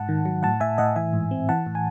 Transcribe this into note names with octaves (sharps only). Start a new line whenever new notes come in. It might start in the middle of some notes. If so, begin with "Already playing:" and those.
Already playing: G#2 F#5 A5
D#3
F#3
A2 F#5 A5
A2 E5 G#5
A2 D#5 F#5
E3 E5 G#5
G#2
C4
E3 F#5 A5
A2
G#5